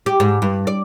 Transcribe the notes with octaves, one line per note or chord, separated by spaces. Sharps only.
G4
G#2
G2
D5